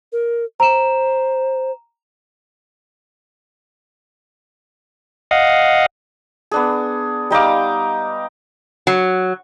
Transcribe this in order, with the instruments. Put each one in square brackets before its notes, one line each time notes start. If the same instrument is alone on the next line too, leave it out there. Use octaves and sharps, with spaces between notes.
[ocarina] A#4
[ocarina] C5 [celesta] A#5 E7
[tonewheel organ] D#5 F5 F#5
[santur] B3 D4 G#4
G3 D#4 F5 D6
[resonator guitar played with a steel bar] F#3